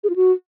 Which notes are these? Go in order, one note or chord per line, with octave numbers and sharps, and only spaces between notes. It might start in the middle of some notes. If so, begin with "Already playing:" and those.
G#4
F4
F#4